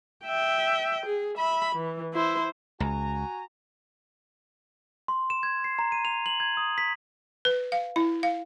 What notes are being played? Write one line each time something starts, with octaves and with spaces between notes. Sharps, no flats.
E5 G5
G#4
E5 B5
E3
E4 C5
C#2 F#4 G#5 A#5
C6
E7
G#6
C7
A#5
D#7
F7
F#7
G#6
D#6
B6
B4
F5
E4
F5